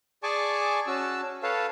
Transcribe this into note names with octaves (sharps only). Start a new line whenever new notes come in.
G#4 D5 G#5 A5 C#6 D6
C#4 F#4 A5 E6
A4 B4 C#5 F5 A5